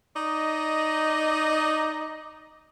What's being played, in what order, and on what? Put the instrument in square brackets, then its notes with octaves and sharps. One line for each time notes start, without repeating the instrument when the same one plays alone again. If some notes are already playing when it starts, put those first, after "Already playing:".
[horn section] D#4 D5 D#5